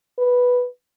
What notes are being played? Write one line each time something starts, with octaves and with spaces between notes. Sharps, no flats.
B4